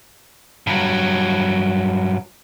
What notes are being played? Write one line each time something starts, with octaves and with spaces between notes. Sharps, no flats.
G2 F#3